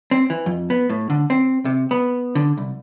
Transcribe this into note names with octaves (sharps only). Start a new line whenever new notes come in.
C4
E3
F2
B3
A2
D3
C4
C3
B3
D3
C2